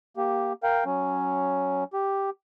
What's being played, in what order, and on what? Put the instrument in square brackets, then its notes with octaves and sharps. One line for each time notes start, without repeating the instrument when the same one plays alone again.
[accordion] A#3 G4
A#4 F5 G5
F#3 C#4
G4